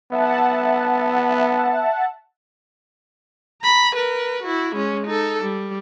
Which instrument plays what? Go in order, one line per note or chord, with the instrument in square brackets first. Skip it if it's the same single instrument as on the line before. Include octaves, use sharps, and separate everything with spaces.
[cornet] B3 [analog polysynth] E5 F#5 A5
[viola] A#5 B5
A#4 B4
E4 F#4
G#3 C#4
D#4 A4
G3